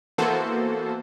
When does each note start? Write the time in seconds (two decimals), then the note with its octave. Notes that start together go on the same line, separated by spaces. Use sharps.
0.18 E3 A#3 B3 F#4 A4 C5